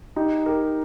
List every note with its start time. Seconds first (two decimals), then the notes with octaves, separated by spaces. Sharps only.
0.16 D#4 G4
0.46 G4 A#4